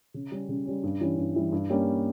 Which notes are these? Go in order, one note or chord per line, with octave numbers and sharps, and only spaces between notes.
C#3
G3 C#4
C#3
G3 C#4
G2
E3 G3 C#4 E4
G2
E3 G3 C#4 E4
G2
G3 A#3 C#4